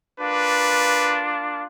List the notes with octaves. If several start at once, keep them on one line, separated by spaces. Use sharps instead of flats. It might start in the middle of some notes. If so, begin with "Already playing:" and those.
A#3 D4 F4 B4